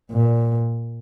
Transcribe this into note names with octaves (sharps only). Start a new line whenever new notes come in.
A#2